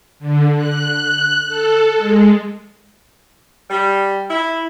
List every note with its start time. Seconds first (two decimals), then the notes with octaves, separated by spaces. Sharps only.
0.19 D3
0.55 F#6
1.47 A4
1.95 G#3
3.70 G3
4.29 E4